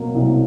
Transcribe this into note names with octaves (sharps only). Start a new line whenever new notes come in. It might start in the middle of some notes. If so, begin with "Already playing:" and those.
Already playing: B2 F#3 A#3
C2